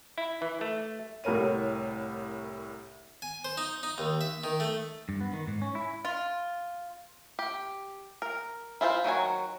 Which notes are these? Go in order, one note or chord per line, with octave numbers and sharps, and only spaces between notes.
E4
E3
A3
C2 A2 A#4 C#5 D#7
G#5
C5
D#4
D#4
D#2
E5
D#3
A3
G2
B3
D#3
G#2
C#4
E4
F4
G4
A#4
E4 F4 A4 C5
D#3 F#3 F#4 G#5